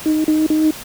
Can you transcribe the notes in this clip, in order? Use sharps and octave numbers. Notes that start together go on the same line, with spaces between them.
D#4
D#4
D#4